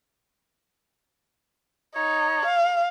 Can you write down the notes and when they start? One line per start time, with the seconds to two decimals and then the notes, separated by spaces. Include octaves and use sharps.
1.95 D#4 C#5
2.45 F5